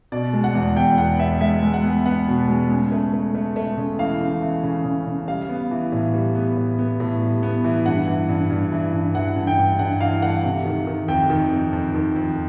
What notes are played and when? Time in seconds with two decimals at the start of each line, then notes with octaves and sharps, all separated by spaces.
0.12 B2 D5
0.33 G#3
0.44 F#5
0.55 E2
0.76 E2 G5
0.98 B3 F#5
1.20 B3 E5
1.41 G#3 E5
1.63 G#3
1.74 F#5
1.84 B3
2.06 B3 F#5
2.27 B2
2.48 G#3
2.70 C#3
2.92 A3
3.13 A3
3.35 A3
3.56 A3
3.77 C#3
3.99 E3 F5
4.20 C#3
4.42 E3
4.63 C#3
4.85 C#3
5.07 C#3
5.28 G3 F5
5.49 B3
5.71 E3
5.92 A2
6.14 G3
6.35 B3
6.57 A2
6.79 B3
7.00 A2
7.21 G3
7.43 B3
7.64 E3
7.86 G2 F#5
8.08 E3
8.29 G2
8.51 G2
8.72 E3
8.93 G2
9.15 E3 F#5
9.36 G2
9.47 G5
9.58 G2
9.79 G2 F#5
10.01 E3 F5
10.22 A3 F#5
10.44 C3
10.65 D#3
10.87 D#3
11.08 F2 G5
11.30 D#3
11.52 F2
11.73 F2
11.94 D#3
12.16 F2